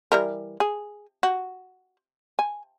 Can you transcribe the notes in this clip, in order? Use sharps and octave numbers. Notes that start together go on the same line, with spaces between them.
E3 G3 A#4
G#4
F#4
G#5